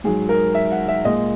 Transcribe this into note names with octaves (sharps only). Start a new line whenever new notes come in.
G#2 F#3 G#4
A#4
E5
F#5
E5
A#2 G#3 D#5